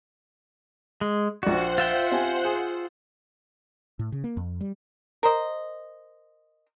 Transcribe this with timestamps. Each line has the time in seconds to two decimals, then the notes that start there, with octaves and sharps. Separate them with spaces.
1.01 G#3
1.43 A#1 F#4 C5 D5 F#5
1.78 F4 E5 G5
2.11 C4 G4 G#5
2.45 G#4
3.99 A2
4.12 C#3
4.24 A#3
4.37 F2
4.61 G3
5.23 A#4 C5 D#5